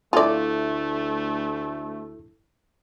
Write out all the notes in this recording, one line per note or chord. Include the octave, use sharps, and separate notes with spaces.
D2 A3 E4 F4 A4 D5